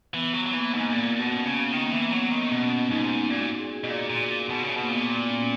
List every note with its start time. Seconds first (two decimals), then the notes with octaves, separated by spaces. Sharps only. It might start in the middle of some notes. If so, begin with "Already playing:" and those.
0.14 E3 B3
0.33 F#3
0.46 F#3
0.53 E3 A#3
0.73 G#2
0.78 A#3
0.92 A#2 B3
1.20 B2
1.33 C#4
1.45 C#3
1.72 D#3 B3
1.82 A#3
1.91 E3 B3
2.07 A#3
2.12 F#3 B3
2.31 D#3
2.41 B3
2.51 B2 C#4
2.91 G#2 D#4
3.30 A#2 F#4
3.59 G#4
3.70 F#4
3.84 B2
3.90 A#2
4.10 A#2
4.49 B2
4.63 C#3
4.76 B2
4.81 A#3
4.88 A#2 B3
5.29 C#4